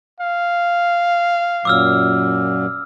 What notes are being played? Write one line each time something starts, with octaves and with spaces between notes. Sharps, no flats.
F5
F#2 A#2 F#3 D6 E6 F6